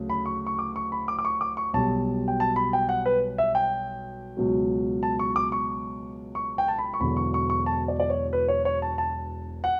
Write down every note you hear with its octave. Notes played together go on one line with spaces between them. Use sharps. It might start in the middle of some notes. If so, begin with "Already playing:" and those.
Already playing: D2 C#3 F#3
B5
C#6
C#6
D6
C#6
B5
D6
D6
C#6
D6
C#6
B1 B2 G3 A5
G5
A5
B5
G5
F#5
B4
E5
G5
C#2 B2 F#3
A5
C#6
D6
C#6
C#6
G5
A5
B5
C#6
E1 E2 D3 F#3 B5
C#6
C#6
C#6
A5
D5
D5
C#5
B4
C#5
C#5
A5
A5
F#5